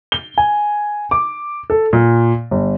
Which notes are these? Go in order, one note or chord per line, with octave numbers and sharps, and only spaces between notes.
G7
G#5
D6
A4
A#2
G1